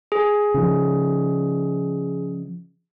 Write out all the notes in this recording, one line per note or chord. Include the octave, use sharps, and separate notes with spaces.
G#4
C#3 F3